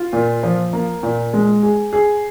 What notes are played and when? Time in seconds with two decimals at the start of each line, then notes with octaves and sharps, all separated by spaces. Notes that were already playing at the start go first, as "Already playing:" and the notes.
Already playing: F4
0.13 A#2
0.43 F3
0.73 A#3
1.03 A#2
1.34 G#3
1.63 G#4
1.93 G#4